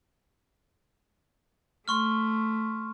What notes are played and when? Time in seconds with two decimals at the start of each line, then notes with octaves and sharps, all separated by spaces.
1.88 A3 C6 C#6 F6